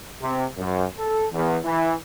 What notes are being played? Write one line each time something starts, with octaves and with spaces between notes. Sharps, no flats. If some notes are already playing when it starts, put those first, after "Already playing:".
C3
F#2
A4
E2
E3